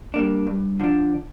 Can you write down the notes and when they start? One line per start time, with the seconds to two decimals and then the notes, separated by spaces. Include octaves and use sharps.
0.14 G3 A#3 D4
0.47 G2
0.80 D3 F3 D4